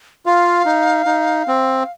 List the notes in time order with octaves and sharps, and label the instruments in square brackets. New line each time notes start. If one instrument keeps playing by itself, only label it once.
[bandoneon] F4 [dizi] F5
[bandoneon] D#4
D#4
C4